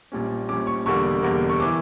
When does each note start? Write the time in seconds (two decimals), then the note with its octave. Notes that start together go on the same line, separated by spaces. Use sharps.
0.12 A#1 A#2 G3 C#4
0.49 A#1 A#2 G3 C#4 D6
0.67 C#6
0.86 E1 E2 D3 G3 A#3 C#6
1.23 E1 E2 D3 G3 A#3
1.50 C#6
1.60 E3 D6